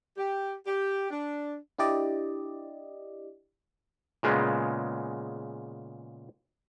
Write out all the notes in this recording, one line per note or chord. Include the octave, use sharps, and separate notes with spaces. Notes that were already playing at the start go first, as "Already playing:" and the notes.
G4
G4
D4
D4 E4 G4 D5 D#5
A#2 C#3 G#3 B3